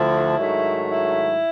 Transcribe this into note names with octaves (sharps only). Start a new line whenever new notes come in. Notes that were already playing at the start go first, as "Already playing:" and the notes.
Already playing: D2 D3 F3 E4
G#2 D#3 F#3 A3
E4